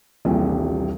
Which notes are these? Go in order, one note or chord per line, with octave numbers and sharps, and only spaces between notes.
D#1 A#1 C3 E3 G3